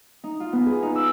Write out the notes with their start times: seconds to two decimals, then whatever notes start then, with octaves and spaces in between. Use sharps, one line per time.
0.24 D#4
0.40 F4
0.53 B3
0.66 G#4
0.82 D#4
0.96 E6